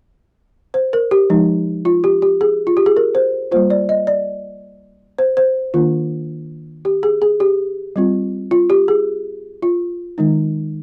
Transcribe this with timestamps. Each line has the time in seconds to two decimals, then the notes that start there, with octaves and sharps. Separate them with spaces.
0.74 C5
0.93 A#4
1.11 G4
1.30 F3 G#3 D#4
1.85 F4
2.04 G4
2.22 G4
2.41 G#4
2.67 F4
2.77 G4
2.86 G#4
2.97 A#4
3.15 C5
3.52 G3 A#3 F4 C5
3.70 D5
3.89 D#5
4.07 D5
5.18 C5
5.37 C5
5.74 D#3 A#3 D4 F4
6.85 G4
7.03 G#4
7.22 G#4
7.40 G4
7.96 G3 C4 F4
8.51 F4
8.70 G4
8.88 G#4
9.62 F4
10.18 D#3 G#3 D#4